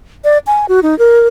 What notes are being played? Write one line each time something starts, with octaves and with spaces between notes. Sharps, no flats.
D5
G#5
F#4
D#4
A#4